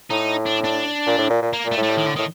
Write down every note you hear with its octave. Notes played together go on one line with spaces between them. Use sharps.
A2 D#4
D4
D4
A#2
A2
A#2
A#2
A#3
A#2
A3
A2
A3
G3
D#3
D3
A2 D#3